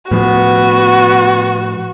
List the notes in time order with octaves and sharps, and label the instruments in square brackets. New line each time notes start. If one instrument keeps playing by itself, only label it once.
[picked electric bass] A2 F3 [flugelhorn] B3 [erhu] F#4